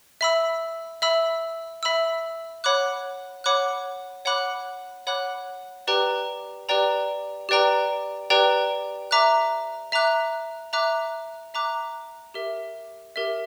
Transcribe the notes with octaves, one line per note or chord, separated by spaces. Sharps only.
E5 B5 E6
E5 B5 E6
E5 B5 E6
C#5 F#5 B5 D6 F#6
C#5 F#5 B5 D6 F#6
C#5 F#5 B5 D6 F#6
C#5 F#5 B5 D6 F#6
G4 B4 D5 G5 A#5
G4 B4 D5 G5 A#5
G4 B4 D5 G5 A#5
G4 B4 D5 G5 A#5
E5 A#5 D6 F#6
E5 A#5 D6 F#6
E5 A#5 D6 F#6
E5 A#5 D6 F#6
G4 A#4 E5
G4 A#4 E5